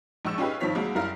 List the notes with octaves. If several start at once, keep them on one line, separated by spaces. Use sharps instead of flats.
A#1 G#2 C#6 E6 E7
C#4 D#4 F4 G4 G#4 B4
G2 D#3 F3 C4 C#5 B6
C2 F#3 G#3 A#3
F#1 G3 E4 A#4 F5